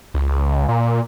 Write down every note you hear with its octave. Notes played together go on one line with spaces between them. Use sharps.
C#2
A#2